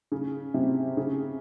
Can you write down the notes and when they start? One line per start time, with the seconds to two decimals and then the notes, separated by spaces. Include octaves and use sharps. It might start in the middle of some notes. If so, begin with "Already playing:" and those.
0.12 C#3
0.54 C3
0.97 C#3